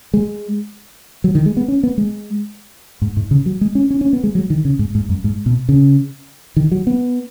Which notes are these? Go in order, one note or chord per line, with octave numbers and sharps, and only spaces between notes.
G#3
F#3
D#3
G#3
B3
C#4
B3
G#3
G#2
G#2
C#3
F#3
G#3
C#4
C#4
C#4
B3
G#3
F#3
D#3
C#3
G#2
G#2
F#2
G#2
B2
C#3
D#3
F#3
B3